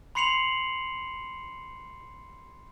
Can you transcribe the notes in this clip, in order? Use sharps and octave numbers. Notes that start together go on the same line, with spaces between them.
B5 C6 C7 C#7 F7 F#7